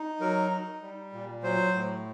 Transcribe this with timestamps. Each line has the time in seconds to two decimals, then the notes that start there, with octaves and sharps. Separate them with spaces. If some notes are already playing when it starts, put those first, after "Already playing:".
Already playing: D#4
0.20 F#3 A#4
0.51 D#4
0.82 G3
1.13 A#2
1.43 F#3 C5
1.74 A2